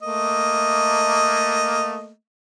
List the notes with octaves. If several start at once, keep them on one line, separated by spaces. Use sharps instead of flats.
A3 A#3 D#5